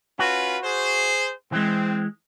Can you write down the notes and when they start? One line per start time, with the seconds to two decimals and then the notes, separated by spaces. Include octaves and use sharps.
0.19 C#4 F4 F#4 B4
0.64 G#4 C5
1.52 E3 G#3 C4